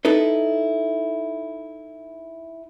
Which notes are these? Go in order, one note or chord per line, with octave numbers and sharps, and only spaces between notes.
D#4 E4 A4 B4